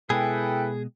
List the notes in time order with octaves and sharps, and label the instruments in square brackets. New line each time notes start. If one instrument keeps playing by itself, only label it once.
[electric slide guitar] B2 G#3 [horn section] E4 A4 B4 [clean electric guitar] G#4 [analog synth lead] G5